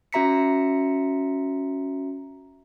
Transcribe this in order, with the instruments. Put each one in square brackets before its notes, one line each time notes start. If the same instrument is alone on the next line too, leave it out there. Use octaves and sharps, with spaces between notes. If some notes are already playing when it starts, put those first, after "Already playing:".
[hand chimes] C#4 F#4 E5 A#5 B6 C#7